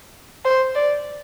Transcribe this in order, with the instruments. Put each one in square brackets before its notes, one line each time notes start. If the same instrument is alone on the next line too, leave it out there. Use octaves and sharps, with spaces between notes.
[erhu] C5
D5